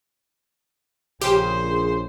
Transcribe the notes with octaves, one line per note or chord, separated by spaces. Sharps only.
A#1 C#3 C#4 G4 G#4 C5